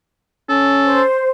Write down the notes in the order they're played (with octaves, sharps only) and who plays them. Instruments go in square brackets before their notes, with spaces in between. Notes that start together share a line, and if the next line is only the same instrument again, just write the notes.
[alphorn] C#4 [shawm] A4
[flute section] C5